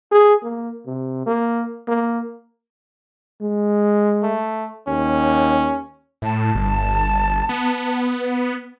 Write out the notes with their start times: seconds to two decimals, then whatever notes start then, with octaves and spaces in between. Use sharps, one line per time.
0.12 G#4
0.43 A#3
0.86 C3
1.26 A#3
1.88 A#3
3.41 G#3
4.23 A3
4.87 D#2 C#4
6.22 A2 A5
6.55 G1
7.49 B3